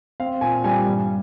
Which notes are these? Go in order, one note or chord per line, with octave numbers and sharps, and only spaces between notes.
C4 F5
A#2 G#5
G3 G#5
G2